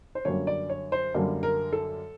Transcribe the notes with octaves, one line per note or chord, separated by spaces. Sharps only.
C5
F#2 D3 G3 A#3 C#5
D5
C#5
C5
F#2 D3 G3 A#3
A#4
A4